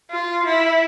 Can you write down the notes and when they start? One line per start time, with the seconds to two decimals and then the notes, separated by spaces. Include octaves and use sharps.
0.11 F4
0.46 E4